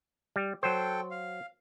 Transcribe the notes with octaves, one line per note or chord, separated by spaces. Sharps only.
G3
F#3 A4 C5 G5
F5